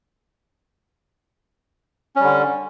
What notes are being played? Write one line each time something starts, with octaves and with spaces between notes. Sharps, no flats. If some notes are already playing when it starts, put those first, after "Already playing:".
D3 G3 C#4